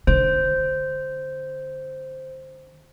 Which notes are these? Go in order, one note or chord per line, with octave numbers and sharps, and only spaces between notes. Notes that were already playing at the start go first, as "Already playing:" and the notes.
D3 C5